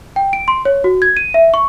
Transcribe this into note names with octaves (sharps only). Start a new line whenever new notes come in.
G5
D7
C6
C#5
F#4
G#6
D#7
E5
C#6